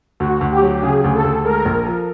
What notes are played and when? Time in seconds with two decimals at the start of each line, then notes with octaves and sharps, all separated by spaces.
0.20 D2 F#4
0.41 D2
0.51 G4
0.62 F#3
0.82 C#3 G#4
1.04 D2
1.14 A4
1.24 D2
1.44 G#3 A#4
1.65 A#1
1.86 F3